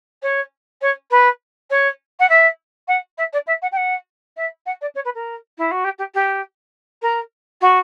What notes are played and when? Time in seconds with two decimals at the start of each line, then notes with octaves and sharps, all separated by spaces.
0.22 C#5
0.81 C#5
1.10 B4
1.70 C#5
2.19 F#5
2.29 E5
2.87 F#5
3.17 E5
3.32 D5
3.46 E5
3.62 F#5
3.72 G5
3.76 F#5
4.36 E5
4.65 F#5
4.81 D5
4.95 C#5
5.04 B4
5.14 A#4
5.57 E4
5.71 F#4
5.84 G4
5.98 G4
6.14 G4
7.01 A#4
7.61 F#4